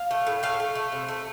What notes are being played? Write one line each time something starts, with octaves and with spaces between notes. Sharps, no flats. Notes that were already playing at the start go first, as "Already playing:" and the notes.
Already playing: F5
A3
A2
A3 F5
A3
A3
C3
A3